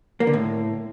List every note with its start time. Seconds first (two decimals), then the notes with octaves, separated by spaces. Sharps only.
0.20 A#3
0.27 D3
0.33 A2